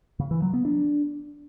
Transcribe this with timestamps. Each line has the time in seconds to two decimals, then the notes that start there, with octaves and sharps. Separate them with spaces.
0.19 C#3
0.31 E3
0.42 F#3
0.54 B3
0.65 D4